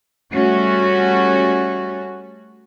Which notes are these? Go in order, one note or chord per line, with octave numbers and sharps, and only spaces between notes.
G3 A3 C#4 F#4